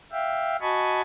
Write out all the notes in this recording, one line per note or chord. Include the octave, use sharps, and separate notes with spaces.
E5 F5 G5
F#4 D#5 G#5 A5 B5 C#6